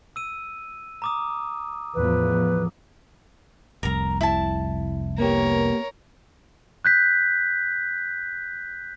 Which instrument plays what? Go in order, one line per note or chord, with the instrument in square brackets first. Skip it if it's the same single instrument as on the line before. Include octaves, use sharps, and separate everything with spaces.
[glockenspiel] E6 D#7
A#5 D6 D#6
[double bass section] E2 A2 F3 [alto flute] B4
[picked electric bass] F1 C2 [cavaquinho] A#4 A#5
[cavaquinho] E4 A5
[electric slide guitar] A#3 B3 G4 [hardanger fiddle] A#4 C#5
[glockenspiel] F#6 G6 B6